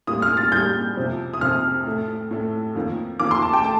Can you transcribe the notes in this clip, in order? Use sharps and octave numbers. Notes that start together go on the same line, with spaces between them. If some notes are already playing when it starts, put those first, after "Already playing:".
A2 G3 A#3 D#6
F6
A6
A2 G3 A#3 G6
F2 C3 F3
D#6
F2 C3 F3 F6
A2 A3
A2 A3
F2 D#3 A#3
F2 D#3 A#3 D6
C6
A5
G5
A3 A5